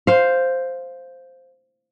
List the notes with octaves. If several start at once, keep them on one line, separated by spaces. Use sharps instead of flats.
C5 F5